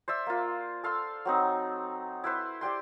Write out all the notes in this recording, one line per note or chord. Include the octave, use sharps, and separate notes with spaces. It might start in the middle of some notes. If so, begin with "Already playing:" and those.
C5 D5 E5 E6
A#3 F4
A4 F5 C6 E6
F#3 C4 D#4
E4 B4 C5
G4 D5 G5 C6